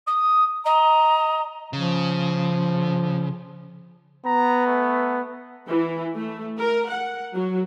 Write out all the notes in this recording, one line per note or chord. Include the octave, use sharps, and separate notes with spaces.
D#6
D#5 A#5
C#3 F3
B3 A#5
A3
E3
A3
A#4
F#5
F#3